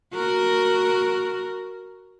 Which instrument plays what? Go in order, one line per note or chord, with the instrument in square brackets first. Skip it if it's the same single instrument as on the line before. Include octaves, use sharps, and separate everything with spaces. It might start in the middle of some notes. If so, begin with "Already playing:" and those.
[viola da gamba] F#4 A#4